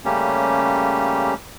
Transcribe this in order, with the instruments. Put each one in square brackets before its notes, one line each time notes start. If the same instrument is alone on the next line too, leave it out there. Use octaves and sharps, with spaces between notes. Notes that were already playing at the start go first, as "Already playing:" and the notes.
[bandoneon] C#3 G3 A3 A#3 C#4 G4